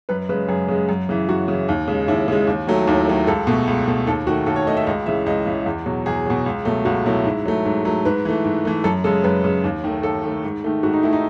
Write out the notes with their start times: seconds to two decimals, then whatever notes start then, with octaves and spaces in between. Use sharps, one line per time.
0.09 F#2 B4
0.29 C#3 B4
0.33 G#3
0.49 F#2 G#4
0.68 C#3 G#3
0.89 F#2
1.09 C#3 E3
1.29 F#2 F#4
1.48 C#3
1.53 E3
1.69 D#2
1.88 C#3 G#3
2.08 D#2 E4
2.28 C#3 G#3
2.47 D#2
2.67 D#3 F#3 A3
2.87 D#2 E4
3.07 D#3 F#3 A3
3.27 C#2 A4
3.47 B2 A3
3.67 C#2
3.88 B2 A3
4.07 D#2 A4
4.27 D#3 A3 F#4
4.47 D#2 A4
4.56 C#5
4.67 A3 D#5
4.70 D#3
4.77 E5
4.87 C#2 D#5
5.06 C#3 E3 E5
5.26 C#2 D#5
5.46 C#3 E3
5.66 E2
5.86 B2 F#3
6.06 E2 G#4
6.26 B2 F#3
6.46 C#2
6.65 B2 F#3 A3
6.85 C#2 F#4
7.06 B2 F#3 A3 E4
7.25 G#2
7.45 F#3 A3
7.65 G#2
7.85 F#3 A3
8.05 G#2 B4
8.25 E3 A3
8.44 G#2
8.65 E3 A3
8.84 F#2 A4
9.04 C#3 G#3 A4
9.24 F#2 B4
9.44 C#3 G#3
9.64 D#2
9.84 D#3 A3
10.03 D#2 A4
10.24 D#3 A3
10.43 G#2
10.64 D#3 A3
10.83 G#2 F#4
10.93 D#4
11.03 D#3 A3 E4
11.13 D#4